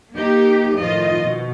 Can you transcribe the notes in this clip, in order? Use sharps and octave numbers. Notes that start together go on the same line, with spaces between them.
A#3 D#4 G4
A2 D#3 F3 F4 D#5
B2